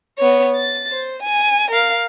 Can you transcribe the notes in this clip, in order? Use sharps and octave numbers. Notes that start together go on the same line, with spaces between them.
B3 C#5
A6
C5
G#5
A#4 F5